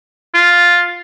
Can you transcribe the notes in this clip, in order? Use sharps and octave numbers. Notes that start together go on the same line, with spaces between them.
F4